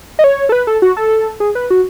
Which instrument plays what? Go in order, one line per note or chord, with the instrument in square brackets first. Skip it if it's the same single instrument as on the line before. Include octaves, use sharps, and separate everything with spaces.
[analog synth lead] D#5
C#5
A4
B4
A4
F#4
A4
G#4
B4
F#4